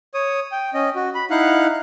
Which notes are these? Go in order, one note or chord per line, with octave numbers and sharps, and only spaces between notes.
C#5 D#6
G5
C#4 D#5
F#4
B5
D#4 E4 F5 F#5 F#6